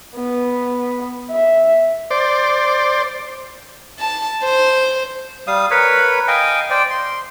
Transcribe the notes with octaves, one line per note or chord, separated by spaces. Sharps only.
B3
E5
C5 D5
A5
C5
G3 F5 D#6
A#4 B4 C#5 B5
D#5 F5 G5 G#5
C5 D5 G5
C6